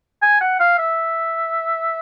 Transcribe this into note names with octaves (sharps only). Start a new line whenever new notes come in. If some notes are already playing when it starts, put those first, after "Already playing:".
G#5
F#5
F5
E5